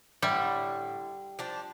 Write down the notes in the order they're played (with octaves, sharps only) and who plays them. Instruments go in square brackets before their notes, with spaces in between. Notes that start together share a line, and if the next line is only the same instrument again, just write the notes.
[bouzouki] A2 D3 E5 [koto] G3
[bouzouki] F3 D4 A5